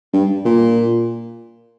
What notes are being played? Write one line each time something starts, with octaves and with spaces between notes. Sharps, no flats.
G2
A#2